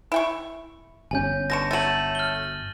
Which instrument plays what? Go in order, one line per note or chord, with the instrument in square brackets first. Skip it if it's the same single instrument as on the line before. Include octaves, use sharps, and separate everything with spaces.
[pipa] E4 G5 C#6
[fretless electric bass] G1 C3 C#4 [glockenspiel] G#5 G6
[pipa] B2 D3 C#6 [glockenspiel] A#6 E7
[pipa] F#3 A3 [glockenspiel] A6 D#7 F#7
[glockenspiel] F6 G7